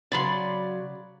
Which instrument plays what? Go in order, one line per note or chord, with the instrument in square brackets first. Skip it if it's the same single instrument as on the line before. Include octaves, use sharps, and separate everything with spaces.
[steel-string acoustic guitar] C#3 F#3 [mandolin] D5 B5 C6